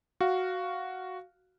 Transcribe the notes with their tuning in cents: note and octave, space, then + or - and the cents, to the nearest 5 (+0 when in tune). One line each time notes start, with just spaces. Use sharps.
F#4 +0 F5 +0